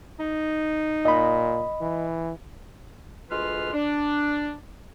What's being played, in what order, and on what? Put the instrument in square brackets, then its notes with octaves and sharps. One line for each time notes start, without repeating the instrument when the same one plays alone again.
[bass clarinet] D#4
[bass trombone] A#2 [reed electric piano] D#5 B5
[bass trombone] E3
[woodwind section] D2 G#3 F4 B4 C6 F6
D4